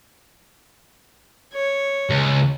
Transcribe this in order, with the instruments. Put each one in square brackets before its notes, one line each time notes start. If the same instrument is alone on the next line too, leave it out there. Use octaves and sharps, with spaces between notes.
[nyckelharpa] C#5
[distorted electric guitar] C#2